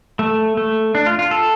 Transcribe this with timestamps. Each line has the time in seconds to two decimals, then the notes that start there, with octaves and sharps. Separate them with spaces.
0.19 A3
0.57 A3
0.95 D4
1.06 F4
1.19 F4
1.31 A4